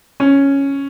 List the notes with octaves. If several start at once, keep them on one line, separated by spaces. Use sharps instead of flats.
C#4